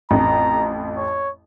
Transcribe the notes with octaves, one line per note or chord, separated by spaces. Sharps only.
A1 F2 A#5
C#5